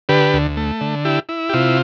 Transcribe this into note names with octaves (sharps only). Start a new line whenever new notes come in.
D3 G4 B4
D2
A3
D3
E4 G4
E4
G4
C3 F4